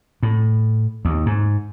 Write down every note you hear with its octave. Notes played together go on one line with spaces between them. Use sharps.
A2
D#2
G#2